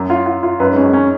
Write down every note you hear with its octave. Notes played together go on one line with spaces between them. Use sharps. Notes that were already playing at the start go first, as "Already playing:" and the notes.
Already playing: F#2
F4
F4
F4
F#2 B4
G#2
C#4
F#2
C#4